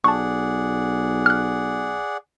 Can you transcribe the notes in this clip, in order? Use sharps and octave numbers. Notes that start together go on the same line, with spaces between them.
B1 G#4 D5 F#5 A5 C#6
F6 F#6